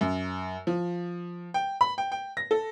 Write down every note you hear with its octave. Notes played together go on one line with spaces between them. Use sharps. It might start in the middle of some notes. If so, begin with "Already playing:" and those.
F#2
F3
G5
B5
G5
G5
A#6
A4